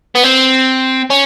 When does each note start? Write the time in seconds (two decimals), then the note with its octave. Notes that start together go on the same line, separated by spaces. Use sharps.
0.15 B3
0.24 C4
1.10 C#4